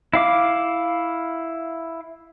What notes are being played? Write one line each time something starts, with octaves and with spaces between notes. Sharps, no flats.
E4 F5 D6